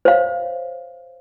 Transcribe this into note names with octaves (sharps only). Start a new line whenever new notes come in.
C5 C#5 F5